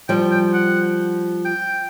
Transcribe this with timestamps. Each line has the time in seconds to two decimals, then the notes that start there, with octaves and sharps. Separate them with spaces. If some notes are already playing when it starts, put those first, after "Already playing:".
0.09 F3 G3 G5
0.31 G5
0.53 F#5
1.45 G5